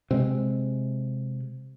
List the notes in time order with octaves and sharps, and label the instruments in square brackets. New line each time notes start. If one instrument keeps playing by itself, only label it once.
[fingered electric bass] C3 G#3